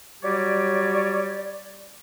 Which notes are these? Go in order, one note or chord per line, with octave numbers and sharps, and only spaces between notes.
F#3 G3 G4 C#5 D5